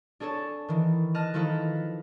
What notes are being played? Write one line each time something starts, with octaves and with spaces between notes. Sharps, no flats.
D4 G#4 A4 C#5 A5
D#3 E3
D#5 A5 F6 F#6
D#3 F3 D#4 E4 A4 B4